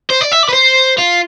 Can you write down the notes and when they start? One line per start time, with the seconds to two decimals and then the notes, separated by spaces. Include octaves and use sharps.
0.10 C5
0.21 D5
0.32 E5
0.43 D5
0.49 B4
0.53 C5
0.98 F4